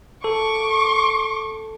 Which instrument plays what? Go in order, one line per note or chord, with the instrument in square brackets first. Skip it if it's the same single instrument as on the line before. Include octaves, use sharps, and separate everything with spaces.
[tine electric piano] A4 [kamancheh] C#6 D6